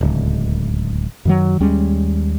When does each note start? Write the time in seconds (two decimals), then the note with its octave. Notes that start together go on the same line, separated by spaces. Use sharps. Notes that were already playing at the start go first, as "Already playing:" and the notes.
0.01 D1 C#2
1.25 F#2 D#3 F#3
1.60 D#2 G3 G#3 C#4